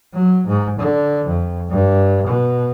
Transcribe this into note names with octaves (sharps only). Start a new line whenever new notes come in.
F#3
G#2
D3
F2
G2
B2